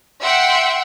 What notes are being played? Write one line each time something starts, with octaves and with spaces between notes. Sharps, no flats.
E5 F#5 G5 C6